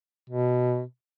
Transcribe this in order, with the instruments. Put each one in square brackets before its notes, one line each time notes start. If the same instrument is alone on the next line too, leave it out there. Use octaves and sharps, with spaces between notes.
[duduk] B2